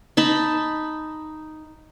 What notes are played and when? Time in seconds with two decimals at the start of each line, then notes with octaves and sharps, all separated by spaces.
0.17 D#4 A5 B5